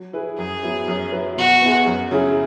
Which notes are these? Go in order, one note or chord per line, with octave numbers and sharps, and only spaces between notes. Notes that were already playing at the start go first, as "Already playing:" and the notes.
Already playing: F#3
E4 G#4 B4
F#2 G#4
F#3 B3 E4
F#2
F#3 E4 B4
B2 F#4
B3 E4 G#4
F#2
C#3 F#3 E4 G#4